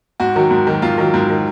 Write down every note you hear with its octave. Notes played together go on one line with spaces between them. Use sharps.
G#2 F#4
D#3 F#3
G#2
D#3 F#3
G#2 F4
D#3 F#3
G#2
D#3 F#3